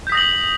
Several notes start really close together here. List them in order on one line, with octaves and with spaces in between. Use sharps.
G6 B6 D#6 A#6 F#7